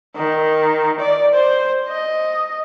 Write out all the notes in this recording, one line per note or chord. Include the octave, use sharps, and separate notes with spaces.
D#3
D5
C5
D#5